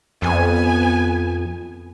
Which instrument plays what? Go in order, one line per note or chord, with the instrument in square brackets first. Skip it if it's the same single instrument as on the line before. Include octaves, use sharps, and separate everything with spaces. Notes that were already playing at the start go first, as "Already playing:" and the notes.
[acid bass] F2 [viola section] B3 G#5